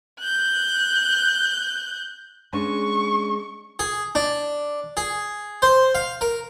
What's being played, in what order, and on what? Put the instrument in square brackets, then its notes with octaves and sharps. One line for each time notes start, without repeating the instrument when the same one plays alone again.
[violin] F#6 G6
[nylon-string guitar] G#3 C#4 D4 [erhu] C#6
[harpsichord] G#4
D4
G#4
C5
F5
A#4